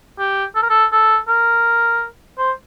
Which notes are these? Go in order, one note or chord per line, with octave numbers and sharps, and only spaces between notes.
G4
A4
A#4
A4
A4
A#4
C5